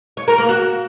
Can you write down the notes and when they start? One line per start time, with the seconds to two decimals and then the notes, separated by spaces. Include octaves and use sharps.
0.17 C#5
0.28 A#4
0.38 A#3
0.49 F#4